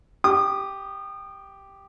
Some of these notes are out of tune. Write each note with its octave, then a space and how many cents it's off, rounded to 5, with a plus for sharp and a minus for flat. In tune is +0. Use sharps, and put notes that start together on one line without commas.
G4 +0 D#6 -30